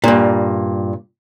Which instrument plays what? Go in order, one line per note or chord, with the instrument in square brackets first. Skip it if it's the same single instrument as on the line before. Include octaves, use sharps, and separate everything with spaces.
[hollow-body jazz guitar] G2 A#2